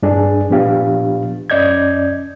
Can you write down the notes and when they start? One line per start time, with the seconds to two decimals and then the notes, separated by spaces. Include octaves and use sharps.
0.03 G2 D4 G#4
0.49 A#2 F3 B3 D4 G4 F5
1.50 F#2 C#4 D5 D#5 G6 G#6